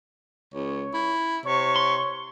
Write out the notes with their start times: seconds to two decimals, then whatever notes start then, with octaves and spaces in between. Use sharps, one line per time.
0.54 C#2 C#5
0.94 E4
1.46 C3 C#5 C#6
1.76 C6